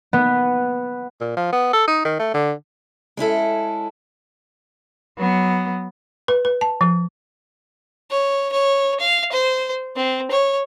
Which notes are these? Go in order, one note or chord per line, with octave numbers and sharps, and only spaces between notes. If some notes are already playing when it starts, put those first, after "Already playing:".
B3
A#2
F3
B3
A4
D#4
D#3
A3
D3
G#3 C#4 E4 A4
F#3 B3
B4
B4
A5
F3
C#5
C#5
F5
C5
C4
C#5